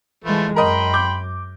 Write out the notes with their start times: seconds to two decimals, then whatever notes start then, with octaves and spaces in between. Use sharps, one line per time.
0.24 E3 F3 G#3 A3 B4
0.56 F#2 A#4 D#5 G5 B5 C6
0.94 D6 G6